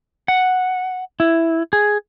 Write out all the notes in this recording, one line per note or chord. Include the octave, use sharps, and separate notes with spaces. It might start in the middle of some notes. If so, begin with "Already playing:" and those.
F#5
E4
G#4